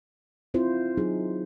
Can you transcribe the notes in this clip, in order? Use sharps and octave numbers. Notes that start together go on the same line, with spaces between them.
C4 E4 F4 C5
F#3 D#4 G#4